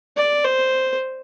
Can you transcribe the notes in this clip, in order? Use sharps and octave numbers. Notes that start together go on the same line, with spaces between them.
D5
C5